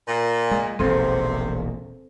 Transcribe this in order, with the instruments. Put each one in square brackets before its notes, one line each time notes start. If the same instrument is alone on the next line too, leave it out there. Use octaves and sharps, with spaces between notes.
[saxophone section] A#2
[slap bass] G#3
[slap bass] E1 A#1 D#2 [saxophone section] C3 [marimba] C4 A4 C5